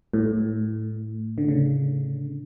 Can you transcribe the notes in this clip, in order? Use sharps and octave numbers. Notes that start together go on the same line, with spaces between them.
A2
D3
C#3